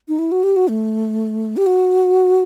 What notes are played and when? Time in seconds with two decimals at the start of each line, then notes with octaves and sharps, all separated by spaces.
0.08 D#4
0.19 E4
0.31 F#4
0.43 G4
0.56 F#4
0.68 A3
1.57 G4
1.66 F#4